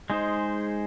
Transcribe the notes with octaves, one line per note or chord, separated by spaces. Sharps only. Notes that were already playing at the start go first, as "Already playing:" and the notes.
G#3 D#4 G#4 C5